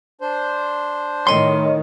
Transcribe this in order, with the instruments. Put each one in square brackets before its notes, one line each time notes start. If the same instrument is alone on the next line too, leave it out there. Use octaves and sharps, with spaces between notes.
[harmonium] D4 C5
[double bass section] A2 D#3 [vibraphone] C#5 D#5 [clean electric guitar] C6